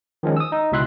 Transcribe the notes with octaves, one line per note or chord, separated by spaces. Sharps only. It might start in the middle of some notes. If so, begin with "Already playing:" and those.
D#3 F3 G#3 C#4
D#6 E6
D#4
C#2 B2 E4 E5 C6 F#6